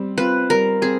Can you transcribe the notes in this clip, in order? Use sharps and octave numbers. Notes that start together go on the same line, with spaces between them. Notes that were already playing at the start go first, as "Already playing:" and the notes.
Already playing: G3 C4
C4 F4 B4
G3 A#4
C4 G#4